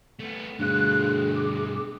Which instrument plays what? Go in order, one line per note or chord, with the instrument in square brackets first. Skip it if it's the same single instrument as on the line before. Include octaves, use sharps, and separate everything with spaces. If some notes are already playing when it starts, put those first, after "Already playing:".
[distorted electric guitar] A3 B3
[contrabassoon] D2 [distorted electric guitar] G2 B2 [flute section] F4 F#6 [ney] G#4
[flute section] D6